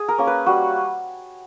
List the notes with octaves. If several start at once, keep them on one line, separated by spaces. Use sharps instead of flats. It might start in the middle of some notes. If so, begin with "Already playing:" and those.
Already playing: G#4
A#4
A#3 C#4
B4
G3 F#4